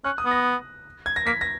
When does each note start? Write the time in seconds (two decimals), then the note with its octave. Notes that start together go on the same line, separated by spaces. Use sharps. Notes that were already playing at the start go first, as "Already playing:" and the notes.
0.04 C#4 F#6
0.18 D#6
0.25 B3
0.31 A#6
1.06 G#6
1.16 A#6
1.26 A#3 B6
1.41 A#6